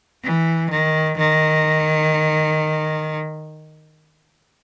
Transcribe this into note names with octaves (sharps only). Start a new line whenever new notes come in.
E3
D#3
D#3